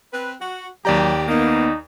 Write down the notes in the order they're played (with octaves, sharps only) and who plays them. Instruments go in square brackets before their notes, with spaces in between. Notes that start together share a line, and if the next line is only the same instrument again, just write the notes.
[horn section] C4 B4
F#4
[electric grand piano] D#2 D5 A#5 [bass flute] F#3 [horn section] G4
[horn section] A#3 [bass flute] B3 [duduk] D#4